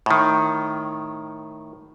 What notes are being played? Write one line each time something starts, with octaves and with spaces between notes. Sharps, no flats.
A2 D#3